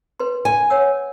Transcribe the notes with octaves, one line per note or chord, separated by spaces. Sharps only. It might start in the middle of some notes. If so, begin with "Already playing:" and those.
B4 C6
G#5
C#5 F#5 E6